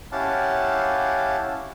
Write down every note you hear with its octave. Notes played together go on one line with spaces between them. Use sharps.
C#4 E4 G4 F5 F#5 A5